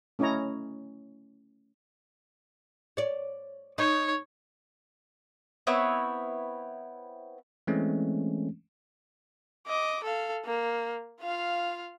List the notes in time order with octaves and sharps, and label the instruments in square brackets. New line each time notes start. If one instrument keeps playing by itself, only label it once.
[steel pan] A3 C#4 E4 C#5 D#5 A#5
[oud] C#5 D5
[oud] D#4 [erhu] C#5
[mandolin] B3 C4 E4 C#5
[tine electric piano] E3 G#3 A3 C4 C#4
[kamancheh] D#5 D6
A4 F5
A#3
F4 F5